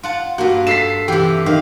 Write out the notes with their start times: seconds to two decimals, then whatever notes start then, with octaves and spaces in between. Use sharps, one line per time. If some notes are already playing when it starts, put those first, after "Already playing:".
0.03 F4 F#5 A5
0.38 G2 A#3 F#4
0.67 A4 B6 C7 E7
1.08 C3 E3 G4
1.46 D#3 F5